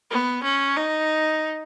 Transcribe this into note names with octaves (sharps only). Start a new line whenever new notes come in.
B3
C#4
D#4